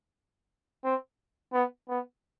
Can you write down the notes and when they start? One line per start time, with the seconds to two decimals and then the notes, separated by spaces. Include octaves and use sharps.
0.85 C4
1.53 B3
1.89 B3